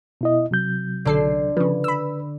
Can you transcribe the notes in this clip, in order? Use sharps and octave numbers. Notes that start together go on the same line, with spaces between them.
B2 E4 D#5
C3 F#3 G6
B1 D3 A4 C7
C#3 F3 B4
B5 E6